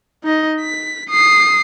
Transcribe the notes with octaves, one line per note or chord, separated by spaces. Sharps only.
D#4 D#5
B6
D#6 C7